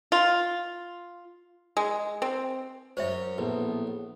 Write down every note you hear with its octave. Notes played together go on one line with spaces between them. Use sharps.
F4
G#3
C4
F#2 C#4 C5 C#5 E5
A#1 A2 B3 B4